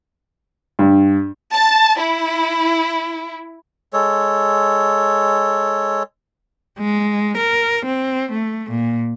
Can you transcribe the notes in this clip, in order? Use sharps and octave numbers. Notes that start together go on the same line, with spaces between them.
G2
A5
E4
G#3 A4 C#5
G#3
A#4
C4
A3
A#2